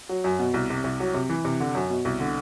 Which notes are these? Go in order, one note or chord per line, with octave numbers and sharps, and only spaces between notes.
F#3
F#2
B2
C2
C3
C2
F#3
C3
E3
C3
D3
F#2
B2
C2
D3